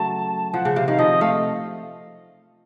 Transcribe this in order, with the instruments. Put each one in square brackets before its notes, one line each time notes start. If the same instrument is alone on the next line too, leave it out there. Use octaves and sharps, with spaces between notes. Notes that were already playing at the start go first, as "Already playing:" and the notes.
Already playing: [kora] C#3 F#3 A3 [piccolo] A5
[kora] F3 [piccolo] F#5
[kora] C#3
[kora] C3 [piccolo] F5
[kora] D#3 [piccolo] F5
[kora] F3 [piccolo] D#5
[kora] A3 [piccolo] F5